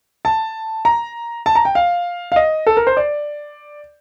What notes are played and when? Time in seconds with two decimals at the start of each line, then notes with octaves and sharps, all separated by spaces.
0.25 A5
0.85 A#5
1.46 A5
1.55 A#5
1.65 G5
1.75 F5
2.32 F5
2.36 D#5
2.67 A4
2.77 A#4
2.87 C5
2.97 D5